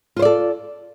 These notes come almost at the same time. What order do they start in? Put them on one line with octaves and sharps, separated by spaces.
F4 C5 D5 A4